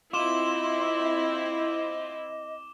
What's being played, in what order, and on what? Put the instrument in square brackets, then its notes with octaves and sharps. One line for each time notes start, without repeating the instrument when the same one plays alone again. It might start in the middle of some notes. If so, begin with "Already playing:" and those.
[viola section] C4 E4 [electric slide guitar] F4 [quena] D#5 [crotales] D6 E7 G7